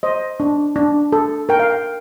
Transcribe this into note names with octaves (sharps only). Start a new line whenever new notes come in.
C5 D#5
D4
D4
A4
A#4 G5
F5
G5